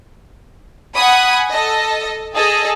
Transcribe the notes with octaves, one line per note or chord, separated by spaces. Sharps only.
F#5 G#5 B5 D#6
A4 D#5
G#4 A4 D#5